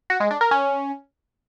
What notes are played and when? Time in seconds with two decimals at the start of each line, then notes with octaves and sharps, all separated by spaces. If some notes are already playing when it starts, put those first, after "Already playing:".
0.10 F#4
0.20 G#3
0.31 D4
0.41 A#4
0.51 C#4